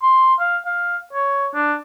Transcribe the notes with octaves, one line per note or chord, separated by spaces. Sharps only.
C6
F5
F5
C#5
D4